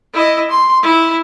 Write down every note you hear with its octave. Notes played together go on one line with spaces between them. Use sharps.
E4 D#5
C6
E4